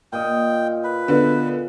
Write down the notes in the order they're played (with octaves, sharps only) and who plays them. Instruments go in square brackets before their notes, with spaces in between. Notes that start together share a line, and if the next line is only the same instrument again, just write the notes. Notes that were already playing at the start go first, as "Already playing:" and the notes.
[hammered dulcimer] A#2 D#5 F#5 [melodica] G5
[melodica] B4
[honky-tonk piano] D3 B3